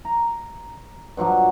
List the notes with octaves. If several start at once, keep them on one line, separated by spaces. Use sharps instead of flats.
A#5
G2 F3 F#3 D4